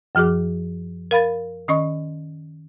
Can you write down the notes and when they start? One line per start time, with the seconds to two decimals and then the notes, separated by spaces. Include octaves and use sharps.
0.15 F#2 F3 F#4 G#4 D6
1.11 A#4 F5 B5 A6
1.68 D#3 C#4 D#5 C#6